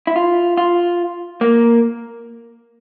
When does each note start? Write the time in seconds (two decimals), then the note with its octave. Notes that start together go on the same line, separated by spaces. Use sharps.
0.07 E4
0.16 F4
0.57 F4
1.41 A#3